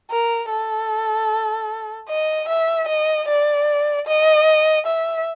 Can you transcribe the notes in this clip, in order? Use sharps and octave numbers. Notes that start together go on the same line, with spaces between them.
A#4
A4
D#5
E5
D#5
D5
D#5
E5